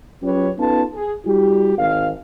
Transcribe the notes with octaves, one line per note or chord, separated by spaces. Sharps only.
F#3 C#4 F4 G4 B4 C#5
B3 C#4 D#4 F4 A4 A5
G#4
G3 E4 F#4 G4
G#1 F5